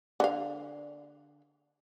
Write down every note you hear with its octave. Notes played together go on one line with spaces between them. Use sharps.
D3 F5